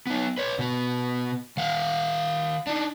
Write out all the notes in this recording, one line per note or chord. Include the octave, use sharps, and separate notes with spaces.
B3 D#4
B4 C#5
B2 B3
D#3 F5 F#5
D4 D#4